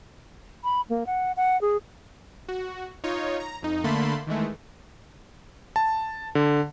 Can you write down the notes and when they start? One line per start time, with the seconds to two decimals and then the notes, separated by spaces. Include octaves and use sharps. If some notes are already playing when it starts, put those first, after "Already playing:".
0.64 B5
0.90 A#3
1.06 F#5
1.37 F#5
1.61 G#4
2.49 F#4
3.04 D#4 F4 C#5
3.40 A#5
3.62 F2 D#4
3.84 D3 A3 A#3 A5 B5 C6
4.27 D#3 E3 G#3 A3
5.76 A5
6.35 D3